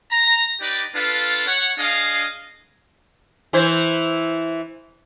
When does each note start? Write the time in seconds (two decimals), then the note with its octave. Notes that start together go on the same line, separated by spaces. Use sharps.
0.12 A#5
0.61 D#4 G4 B4 D5
0.95 D4 F4 A4 B4 F5
1.46 C#5 F#5
1.78 D4 G#4 D#5 F5
3.53 E3 E4 C5